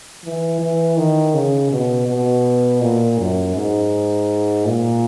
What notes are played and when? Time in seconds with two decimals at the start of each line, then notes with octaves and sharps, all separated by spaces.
0.24 E3
0.60 E3
0.97 D#3
1.34 C#3
1.71 B2
2.07 B2
2.81 A#2
3.19 F#2
3.55 G#2
4.65 A#2